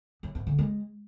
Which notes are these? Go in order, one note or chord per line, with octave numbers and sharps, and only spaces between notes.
F#3
G#2
D3
G#3